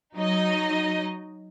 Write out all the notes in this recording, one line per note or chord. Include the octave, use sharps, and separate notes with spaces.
F#3 D#4 D#5